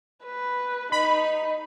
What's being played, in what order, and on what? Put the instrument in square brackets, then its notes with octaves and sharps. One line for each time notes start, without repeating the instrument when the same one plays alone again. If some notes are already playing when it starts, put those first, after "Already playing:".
[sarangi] B4
[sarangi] D#4 [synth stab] B5